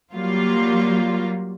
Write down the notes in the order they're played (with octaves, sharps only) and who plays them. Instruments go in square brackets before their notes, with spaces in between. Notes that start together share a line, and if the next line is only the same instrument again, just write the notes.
[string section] F#3 G3 A#3 F4